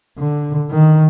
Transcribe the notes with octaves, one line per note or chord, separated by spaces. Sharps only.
D3
D#3